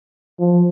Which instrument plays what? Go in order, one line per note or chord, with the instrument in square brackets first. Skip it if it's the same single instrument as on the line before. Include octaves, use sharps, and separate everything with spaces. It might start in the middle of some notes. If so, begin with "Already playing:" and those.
[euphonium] F3